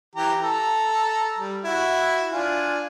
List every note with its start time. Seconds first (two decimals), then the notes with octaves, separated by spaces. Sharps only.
0.16 E3 G4 A#5
0.43 A4 A#5
1.38 G3
1.64 E4 F#4
2.33 D4 F4 G#5